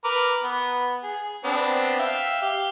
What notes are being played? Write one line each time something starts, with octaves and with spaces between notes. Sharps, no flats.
A#4 B4 D6
B3
G#4
B3 C4 D4
E5 F5 G5
G4 F5